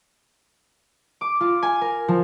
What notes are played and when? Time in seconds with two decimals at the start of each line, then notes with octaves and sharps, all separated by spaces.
1.21 D6
1.41 F4
1.62 G#5
1.81 A#4
2.08 F3